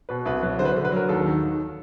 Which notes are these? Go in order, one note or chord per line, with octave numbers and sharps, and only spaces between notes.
B2 B4
C2 B4
F#3 B4
D3 C5
B4
C5
D3
B4
F#3 A#4
D#2 A4
D#3
D#3